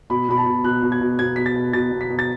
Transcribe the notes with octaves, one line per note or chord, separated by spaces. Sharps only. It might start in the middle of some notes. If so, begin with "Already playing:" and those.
B2 B5
B2 B5
A5
B2
B2 F#6
B2
G#6
B2
B2 G#6
B2 B6
A6
B2
B2 A6
B2
B6
B2
A6